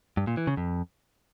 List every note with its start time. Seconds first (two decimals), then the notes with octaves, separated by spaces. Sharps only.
0.17 G2
0.27 A#2
0.37 E3
0.47 C#3
0.57 F2